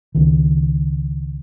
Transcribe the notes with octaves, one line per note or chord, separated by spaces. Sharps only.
C#2 D#3